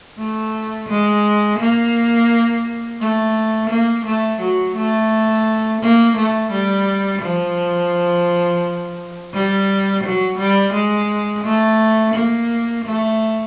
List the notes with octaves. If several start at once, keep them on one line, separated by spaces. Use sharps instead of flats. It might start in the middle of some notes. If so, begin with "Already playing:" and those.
A3
G#3
A#3
A3
A#3
A3
F#3
A3
A#3
A3
G3
F3
G3
F#3
G3
G#3
A3
A#3
A3